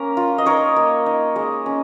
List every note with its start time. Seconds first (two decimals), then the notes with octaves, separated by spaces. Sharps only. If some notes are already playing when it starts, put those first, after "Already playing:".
Already playing: A#3 C#4 A#4
0.17 F4
0.38 D#5
0.46 D#4 A#4 C#5
0.76 A#3
1.06 D#4
1.36 G#3
1.66 C#4